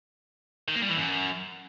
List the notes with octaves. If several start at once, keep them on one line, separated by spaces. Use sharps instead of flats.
D#3
A#3
G3
E3
F#2